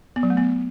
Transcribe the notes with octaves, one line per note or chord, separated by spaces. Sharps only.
B3
F#3
A3
B3